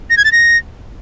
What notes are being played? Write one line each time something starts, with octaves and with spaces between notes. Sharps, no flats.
A#6
G#6
A6
A#6